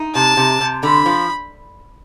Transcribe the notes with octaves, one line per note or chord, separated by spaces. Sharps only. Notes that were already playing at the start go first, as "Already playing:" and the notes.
Already playing: D#4
C3 A5
C3
C3
D3 B5
F3